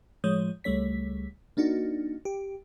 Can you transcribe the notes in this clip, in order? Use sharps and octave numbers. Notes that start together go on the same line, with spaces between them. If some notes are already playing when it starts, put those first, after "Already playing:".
A2 F3 G#3 C#5 D#6 G6
C#2 G3 A3 C#5 B6
A#3 D4 D#4 F#4
G4